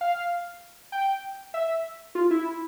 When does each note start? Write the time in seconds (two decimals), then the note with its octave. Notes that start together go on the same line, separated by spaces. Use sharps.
0.01 F5
0.92 G5
1.54 E5
2.15 F4
2.31 E4